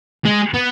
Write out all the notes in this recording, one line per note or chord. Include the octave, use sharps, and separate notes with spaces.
G#3
B3